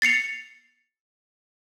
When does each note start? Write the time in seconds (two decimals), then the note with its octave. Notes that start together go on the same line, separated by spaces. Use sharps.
0.02 A6 C7 C#7 F7